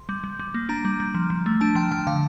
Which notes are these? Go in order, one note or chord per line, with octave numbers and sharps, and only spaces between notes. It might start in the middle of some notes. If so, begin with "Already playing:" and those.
Already playing: C6
G3
G3
G3
A#3
D4 A#5
G3
G3
F3
F3
A3
D4 A5
F3 G5
F3 G5
D3 F5